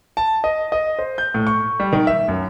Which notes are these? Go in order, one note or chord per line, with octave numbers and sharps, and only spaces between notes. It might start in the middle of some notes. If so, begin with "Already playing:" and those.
A5
D#5
D#5
C5
G6
A2
C#6
G3
D#3
E5
F#2